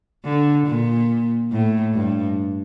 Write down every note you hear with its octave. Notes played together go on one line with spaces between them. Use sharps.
D3
A#2
A2
G2